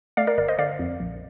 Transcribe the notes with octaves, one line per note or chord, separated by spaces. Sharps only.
A3 D5 F5
A#4 D5
G1 A#4 D5
C5 D#5
D3 D5 F5
F2
A#1